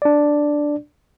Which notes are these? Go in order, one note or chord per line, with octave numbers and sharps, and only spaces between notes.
D4 D5